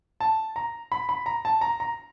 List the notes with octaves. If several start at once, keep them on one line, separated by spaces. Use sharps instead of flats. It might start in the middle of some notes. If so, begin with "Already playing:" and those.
A5
A#5
B5
B5
A#5
A5
A#5
A#5